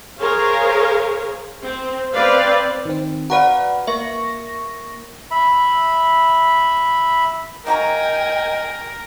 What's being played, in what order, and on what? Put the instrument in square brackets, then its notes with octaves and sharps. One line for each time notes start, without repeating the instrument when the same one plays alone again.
[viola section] G#4 A#4 C5 C#5 F5
C4
C4 B4 D5 F5
[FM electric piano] D#3 C4
[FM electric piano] F#4 B4 F5 [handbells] D5 F#5 A#5
[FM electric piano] A#3 C#6 A#6 [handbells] E5
[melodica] E5 B5
[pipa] A#3 F#4 A#5 [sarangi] A#4 [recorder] D#5 [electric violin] G5 G#5